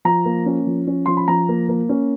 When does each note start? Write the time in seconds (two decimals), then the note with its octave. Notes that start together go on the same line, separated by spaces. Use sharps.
0.05 F3 A#5
0.25 A#3
0.46 C#4
0.67 F3
0.87 C#4
1.06 F3 C6
1.17 B5
1.28 F3 A#5
1.49 A#3
1.69 A#3
1.89 C#4